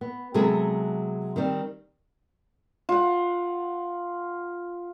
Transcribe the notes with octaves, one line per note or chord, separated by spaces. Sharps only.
B3
C3 F#3 G#3 B3 G#4 A4
D#3 G3 C4
F4 F#5